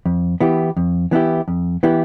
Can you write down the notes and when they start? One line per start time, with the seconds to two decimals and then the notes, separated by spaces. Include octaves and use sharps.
0.06 F2
0.40 E3 B3 E4 G4
0.77 F2
1.11 E3 B3 E4 G4
1.48 F2
1.83 E3 B3 E4 G4